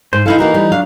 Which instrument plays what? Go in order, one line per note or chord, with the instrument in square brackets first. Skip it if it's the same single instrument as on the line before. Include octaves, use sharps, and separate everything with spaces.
[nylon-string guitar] G#2 [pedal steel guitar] C5
[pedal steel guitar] E3 [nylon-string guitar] D#4 E4 A4 [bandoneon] F5
[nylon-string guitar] A#3 F#4 A#4 [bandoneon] D#4
[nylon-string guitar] G3
[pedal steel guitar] F#3 D4 [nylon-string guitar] F5